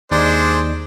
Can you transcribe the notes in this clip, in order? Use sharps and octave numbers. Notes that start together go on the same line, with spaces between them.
D#2 G#3 D4 D#4 C5 D5